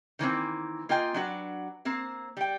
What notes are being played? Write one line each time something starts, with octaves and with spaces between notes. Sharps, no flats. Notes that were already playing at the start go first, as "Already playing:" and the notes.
D#3 E3 A#3 C4
A#3 F4 D#5 G5 G#5
F#3 D4 F#4 B4
A#3 C4 C5
G3 G5